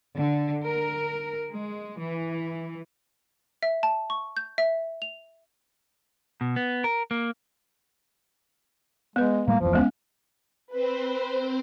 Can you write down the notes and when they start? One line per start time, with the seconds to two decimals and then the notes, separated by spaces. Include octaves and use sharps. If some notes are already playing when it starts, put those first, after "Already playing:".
0.16 D3
0.63 A#4
1.50 G#3
2.01 E3
3.63 E5
3.83 A5
4.10 C#6
4.37 G6
4.58 E5
5.02 F7
6.41 B2
6.56 B3
6.84 A#4
7.11 A#3
9.16 G#3 B3 B4
9.48 A2 G3 G#3 A#3
9.61 D1 F2 E3 F3
9.73 G#3 B3 C#4
10.72 C4 B4 C5